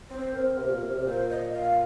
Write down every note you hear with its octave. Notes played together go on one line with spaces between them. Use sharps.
C4 C5
C4 A#4
C3
A#2
C3
C3
A#4
A#2 C5
D#5
F5